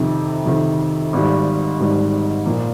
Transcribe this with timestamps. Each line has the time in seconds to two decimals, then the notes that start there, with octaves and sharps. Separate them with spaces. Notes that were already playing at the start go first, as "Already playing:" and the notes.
Already playing: F2 C3 D#3
0.46 F2 C3 D#3
1.13 G#1 G#2 D#3 G3
1.80 G#1 G#2 D#3 G3
2.46 A#2 F3 A#3